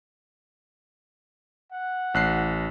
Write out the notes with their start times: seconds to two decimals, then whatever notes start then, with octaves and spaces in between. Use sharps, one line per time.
1.72 F#5
2.14 A1 F#6 C7